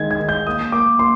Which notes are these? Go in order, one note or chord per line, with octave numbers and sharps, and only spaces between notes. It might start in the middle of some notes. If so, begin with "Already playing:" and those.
Already playing: D#3 G#3 D#4 G#6
G#6
D#3
G6
A#3 D#6
A#3 D6
A#3 C6